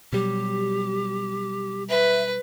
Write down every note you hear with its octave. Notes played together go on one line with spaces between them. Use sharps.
B2 F#3 G3 G4
B4 E5